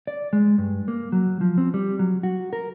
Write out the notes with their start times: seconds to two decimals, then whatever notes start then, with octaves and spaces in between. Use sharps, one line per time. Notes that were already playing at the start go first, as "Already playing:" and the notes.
0.07 D5
0.33 G#3
0.58 G2
0.88 A#3
1.12 F#3
1.41 F3
1.58 C4
1.74 G3
1.99 F#3
2.23 F#4
2.53 A#4